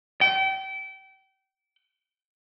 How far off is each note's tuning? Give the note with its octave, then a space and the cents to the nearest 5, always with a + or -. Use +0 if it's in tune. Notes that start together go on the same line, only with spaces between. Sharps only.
G5 -30